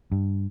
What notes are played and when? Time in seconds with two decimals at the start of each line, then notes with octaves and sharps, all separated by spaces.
0.12 G2